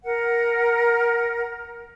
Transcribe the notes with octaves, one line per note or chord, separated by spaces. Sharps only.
A#4 F#5